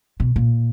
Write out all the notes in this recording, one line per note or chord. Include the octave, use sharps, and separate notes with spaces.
B2
A#2